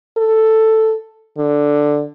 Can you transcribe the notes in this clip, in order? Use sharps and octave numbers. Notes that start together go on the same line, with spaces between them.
A4
D3